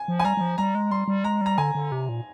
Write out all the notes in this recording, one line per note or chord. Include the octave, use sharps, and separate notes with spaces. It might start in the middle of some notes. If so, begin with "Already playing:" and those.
Already playing: G#5
F3
G#5
G3 A#5
G3
F3
G3 A#5
G#3
G3 C6
G3
G#3 A#5
G3 A#5
D3 G#5
D3
C3
A#2